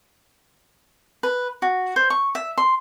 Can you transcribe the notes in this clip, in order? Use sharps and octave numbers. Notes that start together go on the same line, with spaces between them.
B4
F#4
C5
C#6
E5
C6